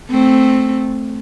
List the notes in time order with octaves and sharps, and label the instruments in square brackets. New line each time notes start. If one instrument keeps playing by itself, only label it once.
[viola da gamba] A3 C4